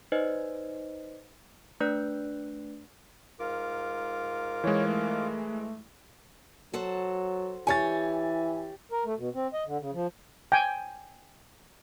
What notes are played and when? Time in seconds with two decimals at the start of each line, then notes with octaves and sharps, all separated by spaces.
0.12 D#4 B4 C5 D5 D#5
1.80 A3 D4 B4 D5 F#6
3.40 G#2 F4 A#4 D6
4.64 E3 G#3 C#5
4.86 A3
6.74 F#3 F#4 A4 C5
7.67 E3 G4 C#5 G#5 A6
8.92 A#4
9.05 A3
9.18 B2
9.35 C4
9.53 D#5
9.66 D3
9.80 C#3
9.93 F3
10.52 G5 G#5